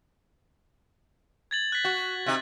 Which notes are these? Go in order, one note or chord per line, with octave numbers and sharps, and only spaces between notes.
G#6 A6 F#7
F#6 B6
F#4
C3 D#4